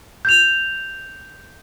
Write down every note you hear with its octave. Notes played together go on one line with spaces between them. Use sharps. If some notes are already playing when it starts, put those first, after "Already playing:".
G6 F7